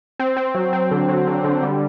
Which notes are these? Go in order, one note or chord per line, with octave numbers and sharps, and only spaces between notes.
C4
C4
F#3
C4
D3
F#3
D3
D3
G3